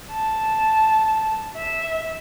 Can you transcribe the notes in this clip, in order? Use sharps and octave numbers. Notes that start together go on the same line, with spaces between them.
A5
E5